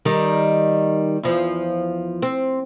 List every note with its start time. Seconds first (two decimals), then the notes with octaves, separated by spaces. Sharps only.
0.05 D#3 G3 D#4
1.23 E2 F3
2.23 C4